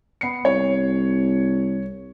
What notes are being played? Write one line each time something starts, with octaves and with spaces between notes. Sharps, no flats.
B3 C7 C#7
C2 C#5